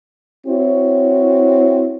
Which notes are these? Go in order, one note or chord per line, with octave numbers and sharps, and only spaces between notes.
C4 E4 F#4 C#5